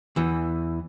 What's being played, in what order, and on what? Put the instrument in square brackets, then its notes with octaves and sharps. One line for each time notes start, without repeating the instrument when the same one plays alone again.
[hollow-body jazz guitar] E2 E3